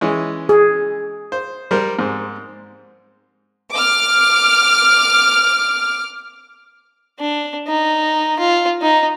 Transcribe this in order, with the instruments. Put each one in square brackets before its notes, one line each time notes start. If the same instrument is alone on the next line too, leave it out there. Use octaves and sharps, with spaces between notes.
[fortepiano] E3 G#3 C#4
[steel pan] G#4
[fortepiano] C5
G3 A#4 C5
G#2 C4
[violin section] D6 F6
[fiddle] D4
D#4
F4
D#4